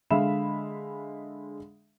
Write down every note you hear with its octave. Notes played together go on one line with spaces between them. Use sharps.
D3 G#3 E5 F5 B5 E7